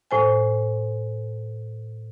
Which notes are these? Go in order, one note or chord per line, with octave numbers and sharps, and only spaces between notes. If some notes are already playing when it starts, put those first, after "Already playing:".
A2 C5 G#5